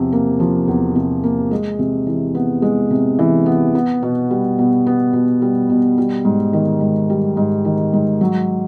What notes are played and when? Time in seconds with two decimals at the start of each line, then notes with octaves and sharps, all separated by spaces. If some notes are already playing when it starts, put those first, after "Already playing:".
Already playing: E2 C3 F3
0.12 A#3
0.40 F3
0.68 E2
0.96 C3
1.24 A#3
1.51 G#3
1.79 C3
2.07 E3
2.35 B3
2.62 G#3
2.91 C3
3.19 E3
3.46 B3
3.75 B3
4.03 B2
4.31 G3
4.59 B2
4.86 B3
5.13 B2
5.42 G3
5.70 B2
5.98 G3
6.25 G#2
6.53 D#3
6.81 G#2
7.10 G3
7.37 G#2
7.65 D#3
7.93 G#2
8.21 F#3